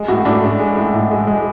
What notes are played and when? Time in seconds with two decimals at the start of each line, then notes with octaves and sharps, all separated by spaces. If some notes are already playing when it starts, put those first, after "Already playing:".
Already playing: G#3
0.08 A2 F#4
0.25 A2 D4
0.42 G#3
0.59 G#3
0.77 A2
0.94 A2
1.11 G#3
1.27 G#3